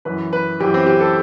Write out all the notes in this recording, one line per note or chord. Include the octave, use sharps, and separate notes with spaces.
F#2 E3 B4
B4
F#2 E3 G4
C4
G4
A4